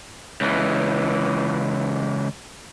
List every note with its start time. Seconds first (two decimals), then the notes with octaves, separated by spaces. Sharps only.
0.41 C#2 E3